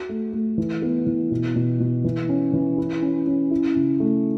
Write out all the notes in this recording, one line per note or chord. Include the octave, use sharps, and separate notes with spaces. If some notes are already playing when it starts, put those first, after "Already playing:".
Already playing: F#4
A3
A3
E3
B3
E3
B2
B2
B2
E3
C#4
E3
E4
C#4
C#4
E4
C#3
A3